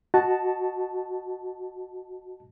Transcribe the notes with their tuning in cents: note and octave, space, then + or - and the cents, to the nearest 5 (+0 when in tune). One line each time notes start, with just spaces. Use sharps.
F#4 +0 D#5 -5 A5 +0